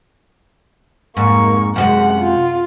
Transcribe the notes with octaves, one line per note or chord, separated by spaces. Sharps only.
F2 G#2 A#3 C#6
F#2 C3 G#3 F#5
F4